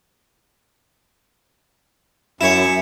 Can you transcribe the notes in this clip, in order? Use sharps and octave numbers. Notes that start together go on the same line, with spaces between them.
F#2 E4 C#5